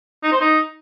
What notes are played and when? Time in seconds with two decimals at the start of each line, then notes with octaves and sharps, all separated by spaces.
0.23 D#4
0.32 C5
0.41 D#4